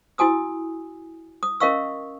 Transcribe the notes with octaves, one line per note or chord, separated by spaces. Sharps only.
E4 F#4 G#5 D#6 E6
D#6
C#4 A#4 D#5 F5 C#6 E6